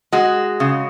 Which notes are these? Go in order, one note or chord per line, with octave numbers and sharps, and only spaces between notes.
G#3 F#4
C#3